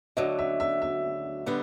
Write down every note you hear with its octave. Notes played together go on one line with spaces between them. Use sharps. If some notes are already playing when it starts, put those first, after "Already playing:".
D2 D3 F#3 D#5
E5
E5
E5
D3 G3 B3